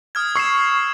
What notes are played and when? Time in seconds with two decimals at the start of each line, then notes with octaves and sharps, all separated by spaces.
0.15 D#6 F6 G#6
0.36 C#6 E6 C7 E7